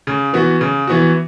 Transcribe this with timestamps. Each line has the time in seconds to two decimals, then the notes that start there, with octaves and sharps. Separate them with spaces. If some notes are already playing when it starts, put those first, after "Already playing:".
0.07 C#3
0.33 E3 B3 F#4
0.61 C#3
0.87 E3 B3 F#4